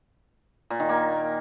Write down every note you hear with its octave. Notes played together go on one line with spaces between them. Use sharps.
A#2
D#3
A#3